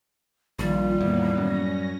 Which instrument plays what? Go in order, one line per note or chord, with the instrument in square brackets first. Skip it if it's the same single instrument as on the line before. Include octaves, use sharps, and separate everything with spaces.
[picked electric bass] A#1 [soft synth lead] D#3 [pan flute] G3 [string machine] F4
[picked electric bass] E2 [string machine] A2 A#3 B3
[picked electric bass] F#2 [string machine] C#4 A#6